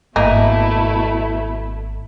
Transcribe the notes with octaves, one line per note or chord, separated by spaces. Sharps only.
G#1 B2 A3 A#3 D#4 E4